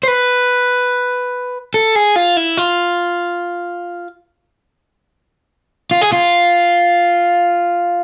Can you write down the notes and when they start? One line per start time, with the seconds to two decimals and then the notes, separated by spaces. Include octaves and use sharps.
0.03 C5
0.08 B4
1.74 A4
1.95 G#4
2.16 F4
2.37 E4
2.57 F4
5.91 F4
6.01 G#4
6.12 F4